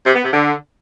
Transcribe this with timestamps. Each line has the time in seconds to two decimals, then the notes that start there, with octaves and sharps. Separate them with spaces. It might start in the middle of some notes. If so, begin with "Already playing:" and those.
0.06 C3
0.15 B3
0.24 C3
0.33 D3